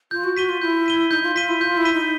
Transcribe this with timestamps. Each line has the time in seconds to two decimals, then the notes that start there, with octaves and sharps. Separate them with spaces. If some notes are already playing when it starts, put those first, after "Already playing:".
0.11 F4 G6
0.24 F#4
0.37 F#4 B6 D#7 G7
0.49 F4
0.61 E4 G6
0.86 B6 D#7 G7
1.11 D#4 G6
1.23 F4
1.36 F4 B6 D#7 G7
1.48 E4
1.61 F4 G6
1.77 E4
1.85 B6 D#7 G7
1.93 D#4